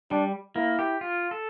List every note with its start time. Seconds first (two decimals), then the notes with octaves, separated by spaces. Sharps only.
0.11 G3 D4
0.56 A#3 E4
0.79 G4
1.01 F4
1.31 A4